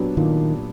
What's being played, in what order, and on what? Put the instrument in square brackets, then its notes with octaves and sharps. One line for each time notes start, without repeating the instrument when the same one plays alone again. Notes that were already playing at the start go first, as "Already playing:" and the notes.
Already playing: [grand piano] A#2 F#3 B3 D4 G4
[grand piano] A#2 [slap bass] D#3